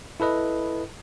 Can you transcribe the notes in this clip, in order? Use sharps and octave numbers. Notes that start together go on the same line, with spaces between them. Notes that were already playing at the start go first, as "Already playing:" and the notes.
E4 A4 B4 D#5